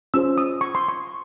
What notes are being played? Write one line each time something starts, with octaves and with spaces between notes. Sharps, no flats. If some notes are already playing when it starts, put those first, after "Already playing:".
C#4 F4 G#4 C5 E6
D#6
C#6
C6
C#6